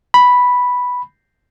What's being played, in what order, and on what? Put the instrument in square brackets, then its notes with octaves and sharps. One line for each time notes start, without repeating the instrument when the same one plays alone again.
[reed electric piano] B5